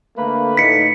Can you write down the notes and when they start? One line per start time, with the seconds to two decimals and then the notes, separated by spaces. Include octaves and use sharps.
0.17 D3 A3 A#3 B4
0.57 A2 D#4 B6 C#7